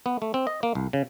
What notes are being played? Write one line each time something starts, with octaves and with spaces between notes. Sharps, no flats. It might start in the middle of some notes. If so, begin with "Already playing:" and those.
B3
A3
C4
D#5
A#3
C2
C#3